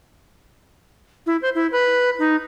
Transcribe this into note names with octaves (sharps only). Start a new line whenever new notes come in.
E4
C5
E4
B4
D#4